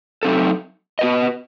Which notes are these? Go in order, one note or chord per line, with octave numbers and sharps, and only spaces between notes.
F#3 A3 C4 D#4 A4
B3 F#4 B4 D#5